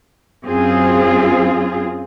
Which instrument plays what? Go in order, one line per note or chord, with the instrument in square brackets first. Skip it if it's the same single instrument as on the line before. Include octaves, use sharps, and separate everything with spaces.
[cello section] F#2 C4 F4 G#4